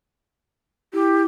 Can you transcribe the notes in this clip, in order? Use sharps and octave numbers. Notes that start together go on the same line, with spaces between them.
E4 G4